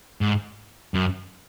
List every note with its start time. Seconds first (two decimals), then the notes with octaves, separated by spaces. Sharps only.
0.21 G#2
0.94 F#2